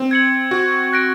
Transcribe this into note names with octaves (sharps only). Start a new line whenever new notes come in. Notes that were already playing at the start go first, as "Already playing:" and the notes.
Already playing: C4
G#6 C#7 F#7
F#4
F#6 A#6 D7